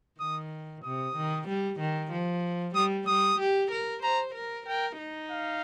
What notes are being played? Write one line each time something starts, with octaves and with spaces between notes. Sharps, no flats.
D#3 D#6
C3 D#6
D#3
G3
D#3
F3
G3 D#6
G3 D#6
G4
A#4
C5 A#5
A#4
A#4 G5
D#4
F5